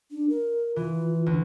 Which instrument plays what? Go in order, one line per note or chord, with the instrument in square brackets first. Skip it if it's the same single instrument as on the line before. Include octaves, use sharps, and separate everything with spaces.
[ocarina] D4
A#4
[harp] E3 [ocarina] F4
[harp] D2